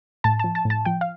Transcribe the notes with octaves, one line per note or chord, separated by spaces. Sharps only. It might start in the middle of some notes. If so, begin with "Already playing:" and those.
A2 A5
F3 A5
A5
A2
A5
F3 G5
F5